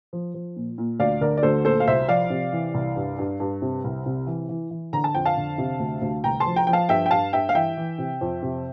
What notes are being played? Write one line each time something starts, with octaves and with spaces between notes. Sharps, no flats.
F3
F3
A#2
A#2
D2 D5 F5
D3 A#4 D5
D5
D2 A4 C5
A#2 A4 C5
F5
C2 C5 E5
F3 D5 F5
C3
E3
C2
G2
G2
G2
C3
C2
C3
E3
E3
E3
D3 A#5
A5
F2 G5
F5 A5
D3
C3
D2
D2
C2 G5 A#5
A5 C6
F3
G5 A#5
F3 G5
F5 A5
G2 E5 G5
G5
G2 F5 A5
G2 E5 G5
F5
E3 E5 G5
E3
C3
F2
C3